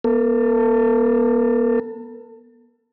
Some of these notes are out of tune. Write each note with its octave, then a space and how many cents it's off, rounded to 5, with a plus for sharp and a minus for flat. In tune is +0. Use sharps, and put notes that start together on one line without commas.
B3 -35 A4 +30